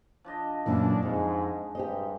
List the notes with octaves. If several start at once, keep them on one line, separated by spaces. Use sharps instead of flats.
F3 D4 D#5
F#2 A#2 E3 D4 A4
F2 G#2 G#3 D#4
G2 G4 C5 D#5